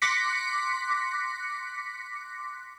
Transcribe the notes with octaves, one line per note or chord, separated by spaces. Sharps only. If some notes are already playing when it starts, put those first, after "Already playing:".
C6 D6 F#6 A#6 B6 C#7